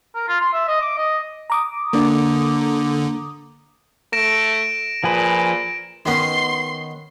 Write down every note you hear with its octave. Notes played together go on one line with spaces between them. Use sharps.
A#4
F4
C6
E5
D#5
D6
D#5
A#5 D6 D#6
D3 A#3 D4
A3 A#6 D7 E7
A#2 F3 G#4 B4
D#3 B3 C#4 C6